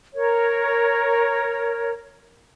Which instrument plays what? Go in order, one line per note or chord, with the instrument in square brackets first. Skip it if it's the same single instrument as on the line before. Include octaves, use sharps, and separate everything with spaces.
[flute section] A#4 C#5